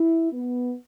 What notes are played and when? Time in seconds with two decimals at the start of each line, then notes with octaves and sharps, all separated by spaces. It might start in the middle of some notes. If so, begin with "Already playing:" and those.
Already playing: E4
0.32 B3